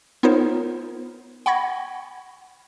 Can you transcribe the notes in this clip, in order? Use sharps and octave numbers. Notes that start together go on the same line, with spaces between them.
B3 D#4 F4 A#4 C5 C#5
F#5 G5 B5 C#6 G#6 A#6